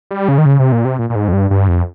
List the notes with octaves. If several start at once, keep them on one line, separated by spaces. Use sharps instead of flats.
G3
C#3
D#3
C#3
C3
A#2
C3
A#2
A#2
G#2
F2
G2
G2
F2